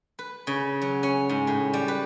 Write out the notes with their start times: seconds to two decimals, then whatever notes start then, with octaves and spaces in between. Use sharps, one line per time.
0.19 B4
0.47 C#3
0.82 F#3
1.03 C#4
1.29 G#2
1.47 A2
1.73 G3
1.88 B4